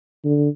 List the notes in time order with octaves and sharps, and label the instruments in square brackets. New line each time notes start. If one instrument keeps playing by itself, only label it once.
[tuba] D3